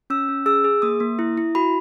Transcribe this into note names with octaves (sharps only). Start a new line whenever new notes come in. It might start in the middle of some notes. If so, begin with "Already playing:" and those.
C#4 E6
C#4
G#4 E6
G#4
A#3 D#6
A#3
E4
E4
F#4 B5